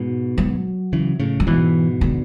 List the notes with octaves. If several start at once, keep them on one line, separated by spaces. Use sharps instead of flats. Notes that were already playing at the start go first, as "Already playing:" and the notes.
Already playing: G#2 B2
F#3
C#3 E3
A2 C#3
F#3
G#2 B2 E3
D3